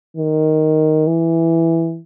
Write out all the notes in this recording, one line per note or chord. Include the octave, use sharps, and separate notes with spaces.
D#3
E3